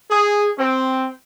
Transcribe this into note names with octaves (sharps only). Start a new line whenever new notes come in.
G#4
C4